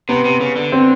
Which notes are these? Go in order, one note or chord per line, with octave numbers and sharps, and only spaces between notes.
C3 B3
C3
C#3
D3
C4